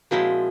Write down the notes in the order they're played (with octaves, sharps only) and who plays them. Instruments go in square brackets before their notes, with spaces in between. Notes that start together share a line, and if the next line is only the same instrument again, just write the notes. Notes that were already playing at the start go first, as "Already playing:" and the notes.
[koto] A#2 F3 G#3 C4 E4 [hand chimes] F#4